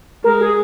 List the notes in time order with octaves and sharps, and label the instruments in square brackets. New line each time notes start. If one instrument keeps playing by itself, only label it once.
[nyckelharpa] G#3 [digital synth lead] A#4
[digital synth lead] G#4